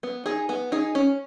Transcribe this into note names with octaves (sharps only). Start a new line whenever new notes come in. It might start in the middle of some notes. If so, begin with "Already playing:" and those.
B3
D#4 G#4
B3
D#4 G#4
C#4